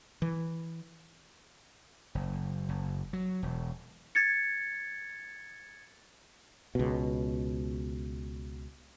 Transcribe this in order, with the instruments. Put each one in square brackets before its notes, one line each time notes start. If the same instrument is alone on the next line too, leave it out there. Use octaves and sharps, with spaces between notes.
[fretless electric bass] E3
[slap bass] F#1
F#1
F#3
E1
[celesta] G#6 A6 C#7
[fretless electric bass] C#2 B2